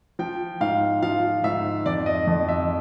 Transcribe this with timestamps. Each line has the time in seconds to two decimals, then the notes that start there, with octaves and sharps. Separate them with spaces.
0.19 F3 G5
0.61 G#2 F5
1.02 F3 F5
1.44 G#2 E5
1.86 F2 D5
2.06 D#5
2.27 F2
2.48 E5